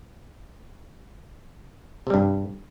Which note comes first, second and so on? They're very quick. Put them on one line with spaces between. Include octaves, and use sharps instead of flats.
C3 G3 G2